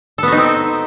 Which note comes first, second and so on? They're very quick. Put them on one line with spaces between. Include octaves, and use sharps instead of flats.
A4 B3 F#4 D#4 C4